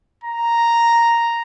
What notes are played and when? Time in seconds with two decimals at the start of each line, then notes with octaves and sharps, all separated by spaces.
0.24 A#5